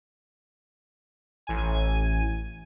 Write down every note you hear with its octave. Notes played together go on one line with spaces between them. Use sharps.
A1 G#5